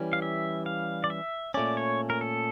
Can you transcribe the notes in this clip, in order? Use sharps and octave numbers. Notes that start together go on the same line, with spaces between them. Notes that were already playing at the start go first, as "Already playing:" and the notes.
Already playing: E3 G3 C#4
F5
E5
F5
D5
E5
A#2 A3 C#4 D5
C#5
A#4
A4